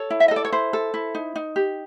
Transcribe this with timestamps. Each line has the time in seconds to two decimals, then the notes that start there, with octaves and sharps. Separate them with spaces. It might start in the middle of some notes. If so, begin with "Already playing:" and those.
Already playing: A4 C#5
0.10 E4
0.20 E5
0.28 D#5
0.31 A4
0.36 D5
0.45 C#5
0.52 E4 C5
0.73 A4
0.94 E4
1.15 D#4
1.36 D#4
1.56 G4